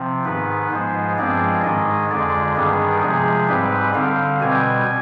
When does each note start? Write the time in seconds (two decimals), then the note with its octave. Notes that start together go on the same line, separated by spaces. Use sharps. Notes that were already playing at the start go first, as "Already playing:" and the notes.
Already playing: C3 F3 C4
0.25 G#2 D#3 B3 B4
0.71 G#2 F3 G#3 B3 C5
1.18 G2 F3 G#3 C4 D5
1.63 G#2 D#3 G#3 D#5
2.09 F2 D3 G#3 D5
2.56 G2 D#3 G3 B3 G#4
3.02 C3 F3 G#3 G#4
3.48 G#2 G3 C4 B4
3.94 D3 G3 C4 F5
4.41 B2 G3 C4 G#5